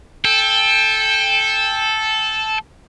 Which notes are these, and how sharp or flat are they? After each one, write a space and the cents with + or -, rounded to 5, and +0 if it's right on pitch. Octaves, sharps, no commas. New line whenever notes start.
A4 -10 G5 +20